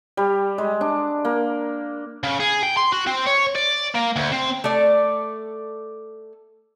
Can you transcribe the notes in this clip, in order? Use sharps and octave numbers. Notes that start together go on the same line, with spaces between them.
G3
G#3
D4
A#3
C#3
G#4
G5
C6
F#4
C4
C#5
D5
A#3
D2
C4
A3 A4 D5